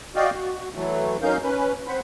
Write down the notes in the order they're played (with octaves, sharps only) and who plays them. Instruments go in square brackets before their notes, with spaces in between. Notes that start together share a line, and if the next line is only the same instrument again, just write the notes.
[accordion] F#4 D5 D#5 F5 G5
F#4
E3 F#3 A3
F#3 C#4 D#4 A#4 F5 G6
C#4 B4
C4 C5 F#5 B5